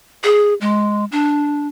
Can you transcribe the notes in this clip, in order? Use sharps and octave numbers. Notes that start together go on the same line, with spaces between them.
G#4
G#3
D4